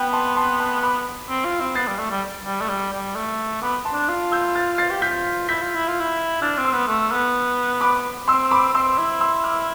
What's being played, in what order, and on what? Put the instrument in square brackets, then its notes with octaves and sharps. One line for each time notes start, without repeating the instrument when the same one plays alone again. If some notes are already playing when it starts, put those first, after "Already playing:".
Already playing: [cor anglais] B3 [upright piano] G5 B5
[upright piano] A5 C6
A5 C6
A5 C6
B5 D6
[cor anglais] C4
F4
C4
[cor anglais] B3 [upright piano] A6 C7
[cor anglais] G3
A3
G3
G3
A3
G3
G3
A3
[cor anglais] B3 [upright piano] B5 D6
[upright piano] A5 C6
[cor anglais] D4
F4
[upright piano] E6 G6
F6 A6
A6 C7
[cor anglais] G4
[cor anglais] F4 [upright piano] G6 B6
[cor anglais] E4 [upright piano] G6 B6
[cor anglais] F4
E4
F4
E4
[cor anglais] D4 [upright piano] F6 A6
[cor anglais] C4
[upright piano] C6 E6
[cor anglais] B3
A3
B3
[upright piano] B5 D6
[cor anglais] C4 [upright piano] C6 E6
[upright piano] B5 D6
[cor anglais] C4 [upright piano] C6 E6
[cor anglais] E4
[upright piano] C6 E6
D6 F6